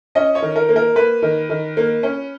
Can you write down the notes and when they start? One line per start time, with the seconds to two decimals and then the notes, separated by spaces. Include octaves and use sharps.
0.15 C#4 D#5
0.35 C#5
0.42 D#3
0.56 A#4
0.69 A#3
0.76 A#4
0.96 A#3 B4
1.22 D#3
1.50 D#3
1.77 A#3
2.03 C#4